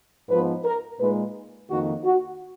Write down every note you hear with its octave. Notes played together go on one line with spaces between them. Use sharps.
G#2 F3 B3 D#4 B4
A#4
A#2 G#3 D#4 B4
F2 D#3 A#3 F#4
F#4